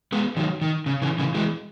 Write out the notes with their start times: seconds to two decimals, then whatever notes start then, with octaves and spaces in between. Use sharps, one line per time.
0.12 G#3 B3
0.37 D#3 F#3
0.61 D#3
0.86 C#3
1.02 C#3 E3
1.18 C#3 E3
1.34 E3 G#3